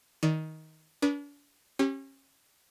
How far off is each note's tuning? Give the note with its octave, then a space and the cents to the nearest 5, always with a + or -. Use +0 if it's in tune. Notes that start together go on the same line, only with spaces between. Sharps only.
D#3 +15 D5 -5
D4 -40 B4 -35 D#6 -35
C#4 -30 G4 +0